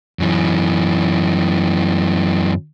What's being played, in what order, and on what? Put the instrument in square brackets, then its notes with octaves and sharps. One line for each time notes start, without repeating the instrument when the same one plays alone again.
[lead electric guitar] F#2 E3